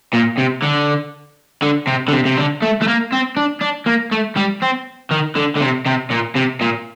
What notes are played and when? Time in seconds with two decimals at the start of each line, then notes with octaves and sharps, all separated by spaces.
0.14 A#2
0.38 C3
0.63 D3
1.62 D3
1.87 C3
2.08 D3
2.12 C3
2.26 C3
2.37 D3
2.62 A3
2.81 A3
2.87 A#3
3.12 C4
3.37 D4
3.61 D4
3.87 A#3
4.11 A3
4.36 G3
4.62 C4
5.11 D#3
5.35 D3
5.56 D3
5.61 C3
5.86 C3
6.10 A#2
6.35 C3
6.61 A#2